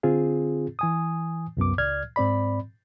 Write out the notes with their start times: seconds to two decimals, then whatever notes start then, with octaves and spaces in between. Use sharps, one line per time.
0.03 D3 C4 F4 G#4
0.79 E3 G#5 D#6
1.57 C2 F#2 B3 D6
1.78 C#2 D5 F6 G#6
2.16 G#2 C4 D5 B5